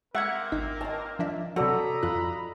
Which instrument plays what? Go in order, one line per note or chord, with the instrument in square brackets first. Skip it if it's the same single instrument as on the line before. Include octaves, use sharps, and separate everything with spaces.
[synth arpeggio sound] G#3 C#6 G#6 [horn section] A#3 C4 A#4 [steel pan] E5 F#5
[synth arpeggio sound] G#1 D#4 B6
[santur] D#5 A5
[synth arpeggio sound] F3 D4 E5
[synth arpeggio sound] C3 F#3 [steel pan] F#4 [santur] A4 D5 [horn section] D#5 A#5 B5
[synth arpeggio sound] F2 F4 F#6